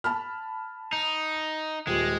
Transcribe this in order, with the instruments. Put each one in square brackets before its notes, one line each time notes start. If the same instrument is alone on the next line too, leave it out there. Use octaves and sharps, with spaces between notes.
[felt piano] A5 B5 F6
[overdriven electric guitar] D#4
[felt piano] D#1 G4 [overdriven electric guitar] G#3